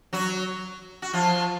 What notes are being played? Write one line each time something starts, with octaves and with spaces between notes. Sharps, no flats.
F#3 F#4
F#4
F3 F4